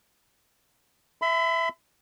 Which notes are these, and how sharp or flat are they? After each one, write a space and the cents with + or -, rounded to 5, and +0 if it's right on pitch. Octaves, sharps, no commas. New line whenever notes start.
E5 +0 B5 +40